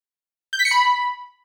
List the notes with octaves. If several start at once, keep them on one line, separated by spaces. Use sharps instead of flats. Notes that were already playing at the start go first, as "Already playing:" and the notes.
G6
B6
C#7
B5